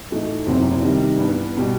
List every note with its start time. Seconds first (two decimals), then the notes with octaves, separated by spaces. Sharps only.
0.11 A2 E3 A3 D#4
0.47 F#1 E2 C3 F#3 C4
0.82 C3 D#3 G3
1.18 G2 E3 B3
1.57 B2 G3